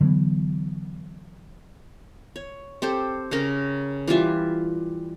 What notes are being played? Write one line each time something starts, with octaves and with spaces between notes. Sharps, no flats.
D3 E3 F#3 B3
C#5
C4 G4 A4 C5
C#3 C#4 A#4
E3 G3 F4 E5